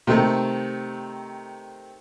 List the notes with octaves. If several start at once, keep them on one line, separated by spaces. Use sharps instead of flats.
C3 D#3 A3